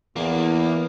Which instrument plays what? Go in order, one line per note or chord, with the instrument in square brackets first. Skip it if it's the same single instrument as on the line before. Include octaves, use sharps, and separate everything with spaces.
[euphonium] E2 [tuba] E3 [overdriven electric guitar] A#3 [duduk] B3